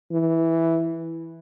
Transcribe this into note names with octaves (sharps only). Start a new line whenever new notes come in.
E3